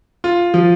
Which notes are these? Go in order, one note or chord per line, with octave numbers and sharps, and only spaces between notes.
F4
F3